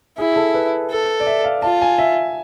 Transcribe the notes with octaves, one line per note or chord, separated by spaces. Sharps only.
E4 G#4
A4
B4
A4
D5
E5
F5
F4 A5
G#5
E5